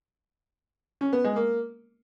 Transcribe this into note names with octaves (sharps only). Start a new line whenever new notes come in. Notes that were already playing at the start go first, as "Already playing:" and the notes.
C#4
B3
G#3
A#3